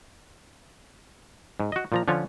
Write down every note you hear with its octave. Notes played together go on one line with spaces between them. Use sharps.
G#2
F#4 D#5
A#2 F3 A#5
D3 F3 C#4 F4 C#5